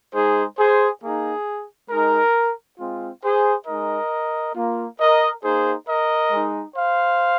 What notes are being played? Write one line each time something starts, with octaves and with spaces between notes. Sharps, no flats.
G#3 D#4 G#4 C5
G#4 C5
A#3 D#4 G#4
G#3 D#4 A#4
G#3 C4 F4
G#4 C5
G#3 D#4 A#4 D#5
A#3 F4
A#4 D#5
A#3 D#4 G#4 C5
A#4 D#5
G#3 D#4
C5 F5